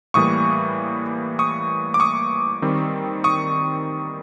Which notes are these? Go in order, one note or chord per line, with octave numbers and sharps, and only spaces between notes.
A2 E3 G3 A#3 C#6 D#6
C#6 D#6
D6
C#6 D#6
D#3 G3 C4
C#6 D#6